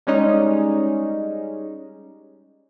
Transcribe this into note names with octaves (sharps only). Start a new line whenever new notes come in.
G3 G#3 C#4 D#4